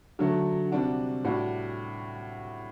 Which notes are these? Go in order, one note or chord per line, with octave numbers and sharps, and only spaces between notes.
D3 F#3 A3
C3 G3 D4 F#4
A2 G3 D4 F#4